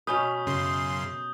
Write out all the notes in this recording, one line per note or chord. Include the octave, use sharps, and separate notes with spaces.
B2 C#4 B4 D#6 G6 G7
F#2 C#3 C6